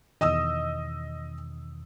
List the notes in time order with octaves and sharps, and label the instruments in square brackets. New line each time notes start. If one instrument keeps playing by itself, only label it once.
[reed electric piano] E2 B2 D#3 [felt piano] D#5 D#6 E6